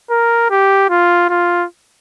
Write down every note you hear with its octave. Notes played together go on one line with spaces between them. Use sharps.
A#4
G4
F4
F4